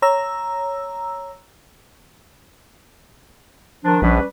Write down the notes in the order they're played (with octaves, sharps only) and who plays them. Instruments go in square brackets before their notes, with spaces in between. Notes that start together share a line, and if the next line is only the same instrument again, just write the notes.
[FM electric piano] C#5 A#5 E6
[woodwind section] D#3 F3 D4
[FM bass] A#1 [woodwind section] G3 C#4 B4